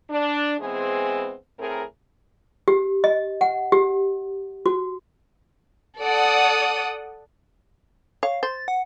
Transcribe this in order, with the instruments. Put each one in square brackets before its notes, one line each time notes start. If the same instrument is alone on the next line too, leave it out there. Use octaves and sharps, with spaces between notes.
[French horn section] D4
E3 G#3 B3 C4 G#4 C5
A2 C4 G#4 A#4
[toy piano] G4
D#5
F#5
G4
F#4
[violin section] A4 D5 F#5 D#6
[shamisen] C#5 [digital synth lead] F5
[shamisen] C5 [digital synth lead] A6
[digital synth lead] F#5